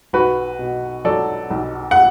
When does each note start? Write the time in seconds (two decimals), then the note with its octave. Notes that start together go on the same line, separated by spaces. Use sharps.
0.13 B1 F#4 B4
0.59 B2
1.05 F#3 A4 D5
1.50 B1
1.91 F#5